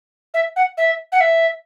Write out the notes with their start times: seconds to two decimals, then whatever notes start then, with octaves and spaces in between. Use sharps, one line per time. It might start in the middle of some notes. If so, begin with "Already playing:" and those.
0.34 E5
0.56 F#5
0.78 E5
1.12 F#5
1.21 E5